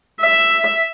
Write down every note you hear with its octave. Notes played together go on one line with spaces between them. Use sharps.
E5